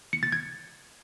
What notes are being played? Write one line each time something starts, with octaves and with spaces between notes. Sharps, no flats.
C#7
A6
G#6